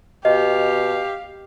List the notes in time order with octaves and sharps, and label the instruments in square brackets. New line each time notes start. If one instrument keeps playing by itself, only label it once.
[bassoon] B2 [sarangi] G4 [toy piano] D#5 [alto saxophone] F5